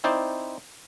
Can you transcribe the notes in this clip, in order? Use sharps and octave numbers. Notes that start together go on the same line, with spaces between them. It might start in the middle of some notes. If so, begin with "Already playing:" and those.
C4 D#4 E4 C5 D5